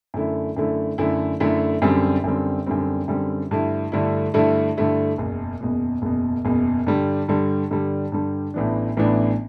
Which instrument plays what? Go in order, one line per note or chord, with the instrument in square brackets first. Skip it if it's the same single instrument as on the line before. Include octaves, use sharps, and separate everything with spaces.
[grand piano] F#2 D3 A3 E4
F#2 D3 A3 E4
F#2 D3 A3 E4
F#2 D3 A3 E4
F#2 D3 G3 C4
F#2 D3 G3 C4
F#2 D3 G3 C4
F#2 D3 G3 C4
G2 D3 A3 E4
G2 D3 A3 E4
G2 D3 A3 E4
G2 D3 A3 E4
F#1 E2 B2
F#1 E2 B2
F#1 E2 B2
F#1 E2 B2
G2 D3 G3
G2 D3 G3
G2 D3 G3
G2 D3 G3
A1 A2 E3 B3 D4
A1 A2 E3 B3 D4